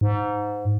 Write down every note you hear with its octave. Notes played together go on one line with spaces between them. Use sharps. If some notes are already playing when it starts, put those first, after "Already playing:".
G#2